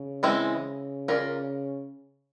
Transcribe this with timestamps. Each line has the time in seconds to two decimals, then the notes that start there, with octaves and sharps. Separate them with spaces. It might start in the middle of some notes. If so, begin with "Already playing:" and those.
Already playing: C#3
0.23 E3 G#3 C4 E4
1.08 C#4 F4 A#4 D5